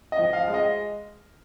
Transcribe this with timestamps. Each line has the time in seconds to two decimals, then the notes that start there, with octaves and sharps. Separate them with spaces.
0.12 D#5
0.19 F3
0.33 F5
0.48 G#3
0.54 D#5